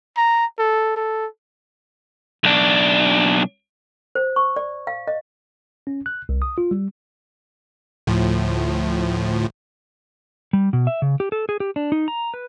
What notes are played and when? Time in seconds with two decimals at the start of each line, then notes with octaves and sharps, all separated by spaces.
0.17 A#5
0.59 A4
0.96 A4
2.44 B1 D4
4.15 C5
4.36 C#6
4.56 D5
4.87 F5
5.08 D#5
5.87 C#4
6.06 F#6
6.29 C2
6.42 D#6
6.58 F4
6.71 G3
8.07 D2 A2 F3
10.53 G3
10.73 B2
10.87 E5
11.02 C#3
11.20 G4
11.32 A4
11.49 G#4
11.60 G4
11.76 D4
11.92 D#4
12.08 A#5
12.34 B4